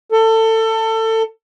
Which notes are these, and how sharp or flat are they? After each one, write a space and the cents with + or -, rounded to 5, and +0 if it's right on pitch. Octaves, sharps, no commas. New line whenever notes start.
A4 +25